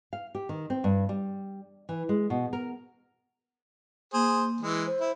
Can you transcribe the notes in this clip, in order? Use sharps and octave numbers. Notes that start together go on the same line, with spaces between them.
F5
G4
D#3
C4
G2
G3
E3
G#3
B2
A#4
A#3 G#4 C5
E3 G#3
C5
E4